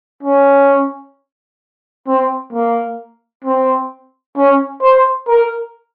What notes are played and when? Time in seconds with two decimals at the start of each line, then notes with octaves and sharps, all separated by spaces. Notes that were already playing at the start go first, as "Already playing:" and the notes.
0.23 C#4
2.07 C4
2.53 A#3
3.45 C4
4.37 C#4
4.82 C5
5.28 A#4